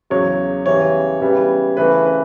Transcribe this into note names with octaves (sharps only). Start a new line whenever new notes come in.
E2 C#3 F#3 C#5
E2 C#3 E3 G3 C#5
C#3 E3 G3 B3
C#3 E3 A3 B4
B4